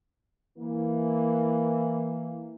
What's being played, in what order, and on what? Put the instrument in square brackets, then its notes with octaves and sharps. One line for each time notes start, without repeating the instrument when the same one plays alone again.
[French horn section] E3 A#3